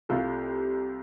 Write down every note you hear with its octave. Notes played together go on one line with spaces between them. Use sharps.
C2 C3 A3 F4 A4